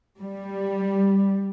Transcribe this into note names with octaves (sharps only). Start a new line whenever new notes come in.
G3